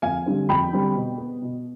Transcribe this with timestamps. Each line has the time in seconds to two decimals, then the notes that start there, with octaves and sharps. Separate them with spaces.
0.02 F2 F5 G#5
0.26 D3 G3 C4
0.49 F2 G5 B5
0.73 D3 G3 C4
0.95 B2
1.18 B3
1.42 B2